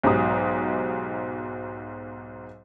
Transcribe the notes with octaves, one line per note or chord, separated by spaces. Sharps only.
B1 G#2 F#3 G4 A#5 D#6